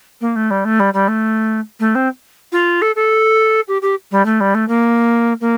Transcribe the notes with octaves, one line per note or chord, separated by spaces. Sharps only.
A#3
A3
G3
A3
G3
G3
A3
A3
C4
F4
A4
A4
G4
G4
G3
A3
G3
A3
A#3
A#3